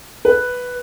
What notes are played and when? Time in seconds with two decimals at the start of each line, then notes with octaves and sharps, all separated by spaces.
0.25 B4